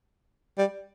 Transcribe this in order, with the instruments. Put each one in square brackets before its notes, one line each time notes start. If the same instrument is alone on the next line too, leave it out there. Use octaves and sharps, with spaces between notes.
[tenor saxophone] G3